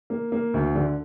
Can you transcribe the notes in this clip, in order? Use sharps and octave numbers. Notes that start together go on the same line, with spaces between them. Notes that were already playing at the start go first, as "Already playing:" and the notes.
A#3
A#3
D2
D3